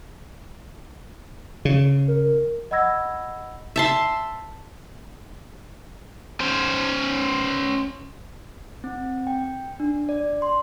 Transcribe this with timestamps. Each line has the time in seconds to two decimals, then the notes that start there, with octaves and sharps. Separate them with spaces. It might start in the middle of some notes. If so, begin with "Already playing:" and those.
1.65 C#3
2.08 A#4
2.71 D#5 F#5 B5 E6 G#6 A#6
3.76 E5 A5 C6
6.40 C#4 C5
8.84 C4
9.27 G5
9.80 D4
10.09 D5
10.42 C6